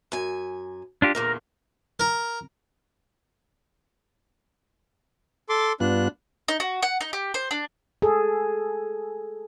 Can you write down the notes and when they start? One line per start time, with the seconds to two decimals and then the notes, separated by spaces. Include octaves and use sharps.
0.12 F#2 G#5
1.02 D4 F4 G4
1.15 E2 A#2 D3 A#4
2.00 A#4
5.49 A4 C6 D6
5.80 G2 B3 D4 F4 F#6
6.48 D#4
6.60 F#4
6.83 F#5
7.01 D#4
7.13 G4
7.34 C5
7.51 D4
8.02 G#4 A4